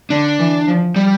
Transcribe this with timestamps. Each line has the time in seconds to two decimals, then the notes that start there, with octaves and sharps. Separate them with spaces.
0.10 D3 D4
0.39 E3
0.68 F3
0.96 G3